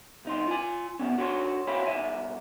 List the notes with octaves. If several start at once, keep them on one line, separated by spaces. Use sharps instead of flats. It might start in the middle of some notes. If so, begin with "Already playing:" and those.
C2 D#4 C6
F4 G#5
C3 D#3 B3 C#4
D4 F#4 C#5 G5 C6
F#4 C#5 E5 F5 B5 C6
B1 C#3 E5 G#5